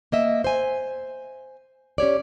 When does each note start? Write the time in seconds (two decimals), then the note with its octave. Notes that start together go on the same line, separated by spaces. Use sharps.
0.12 A#3 D#5 E5
0.44 C5 G#5
1.98 C#4 G4 C#5 D5